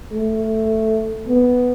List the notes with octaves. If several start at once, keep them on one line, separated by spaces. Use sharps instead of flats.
A3
B3